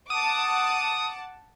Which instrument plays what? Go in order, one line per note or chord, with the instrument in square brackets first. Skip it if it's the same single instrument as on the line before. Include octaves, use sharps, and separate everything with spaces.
[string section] F#5 A5 D6 [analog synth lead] D#6